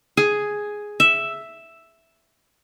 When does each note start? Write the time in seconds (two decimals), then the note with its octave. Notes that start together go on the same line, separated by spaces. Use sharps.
0.17 G#4
1.00 E5